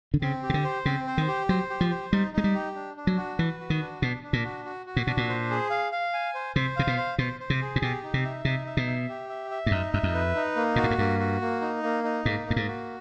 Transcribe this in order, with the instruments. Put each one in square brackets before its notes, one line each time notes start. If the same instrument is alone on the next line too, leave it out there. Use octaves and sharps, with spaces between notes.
[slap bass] D3
[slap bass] C#3 [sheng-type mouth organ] C4
[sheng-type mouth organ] G4
[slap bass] C#3
D3
[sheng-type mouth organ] C5
[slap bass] C#3 [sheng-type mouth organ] C4
[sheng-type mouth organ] C5
[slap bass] D#3
[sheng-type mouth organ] G4
[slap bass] F#3 [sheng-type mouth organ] C5
[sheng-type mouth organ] G4
[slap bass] F3
[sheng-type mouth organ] C5
[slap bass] G3 [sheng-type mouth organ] D#4
[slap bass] G#3 [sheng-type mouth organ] D#4
[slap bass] G3
[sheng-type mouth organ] G4
D4
D4
[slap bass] F#3
[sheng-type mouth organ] F#4
[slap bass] E3 [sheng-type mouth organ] B4
[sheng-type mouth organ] F#4
[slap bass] D#3
[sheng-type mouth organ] D4
[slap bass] B2 [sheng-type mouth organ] D4
[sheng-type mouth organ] D4
[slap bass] A#2
[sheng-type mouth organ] F#4
F#4
F#4
[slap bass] A#2
[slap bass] B2 [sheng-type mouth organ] D4
[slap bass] A#2
[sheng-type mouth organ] C5
G#4
F5
F5
G#5
C5
[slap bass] C3 [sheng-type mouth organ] C5
[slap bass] C3 [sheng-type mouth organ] F5
[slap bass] B2
[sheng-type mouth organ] C5
[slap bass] B2 [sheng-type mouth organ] C5
[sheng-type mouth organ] C5
[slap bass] C3
[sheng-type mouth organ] G#4
[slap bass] A#2
[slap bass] B2 [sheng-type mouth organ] G4
[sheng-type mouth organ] D#4
[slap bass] C3
[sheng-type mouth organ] E5
[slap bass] C3 [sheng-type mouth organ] D#4
[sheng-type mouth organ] E5
[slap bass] B2
[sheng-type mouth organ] E5
G4
E5
E5
[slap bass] G2
[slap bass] F#2 [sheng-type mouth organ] D#4
[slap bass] F#2 [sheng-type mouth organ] E5
[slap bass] F2
[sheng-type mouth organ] B4
D#4
A#3
[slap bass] A#2 [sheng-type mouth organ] F#4
[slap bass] A2
G#2
[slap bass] G2 [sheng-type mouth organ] A#3
[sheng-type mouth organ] F#4
A#3
D#4
A#3
D#4
[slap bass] G#2 [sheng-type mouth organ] A#3
[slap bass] G2 [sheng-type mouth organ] A#3
[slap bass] G#2
[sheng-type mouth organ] F#4